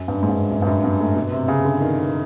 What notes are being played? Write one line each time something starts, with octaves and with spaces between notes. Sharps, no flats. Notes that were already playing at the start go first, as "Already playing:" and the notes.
Already playing: F#2
G2
G#2
G2
F#2
G2
F#2
G2
A2
B2
C3
C#3
D3
D#3